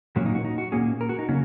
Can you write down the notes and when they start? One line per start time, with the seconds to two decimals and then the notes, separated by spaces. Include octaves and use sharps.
0.16 A#2 F#3 A#3 C#4 F#4
0.26 D#4
0.35 F#4
0.45 D#4
0.58 F#4
0.72 A#2 A#3 C#4 G#4
1.01 A#4
1.09 F#4
1.19 D#4
1.28 C#3 F#3 A#3 C#4